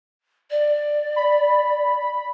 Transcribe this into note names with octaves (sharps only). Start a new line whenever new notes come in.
D5
B5